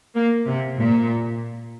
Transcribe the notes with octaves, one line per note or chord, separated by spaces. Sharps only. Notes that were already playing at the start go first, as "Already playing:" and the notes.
A#3
C3
A#2